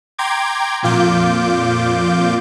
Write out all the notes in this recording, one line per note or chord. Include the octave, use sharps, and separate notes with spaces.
G5 A#5 C6 D6 G#6
F2 A#2 F4 D6 G6